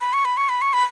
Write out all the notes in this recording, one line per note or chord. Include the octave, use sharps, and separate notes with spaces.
B5
C#6
B5
C#6
B5
C#6
B5